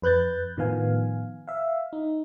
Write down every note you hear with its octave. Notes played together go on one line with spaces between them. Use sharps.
F2 B4 F#6 G6 A6
A2 D#3 F3 B3 F5 G#5
E5 F5
D#4